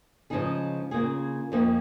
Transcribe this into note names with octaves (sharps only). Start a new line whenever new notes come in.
C#3 F3 G#3 D#4 G#4
C#3 A#3 F4 G#4
F2 F3 A#3 D#4 G#4